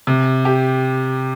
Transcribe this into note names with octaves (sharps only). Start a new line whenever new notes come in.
C3
G4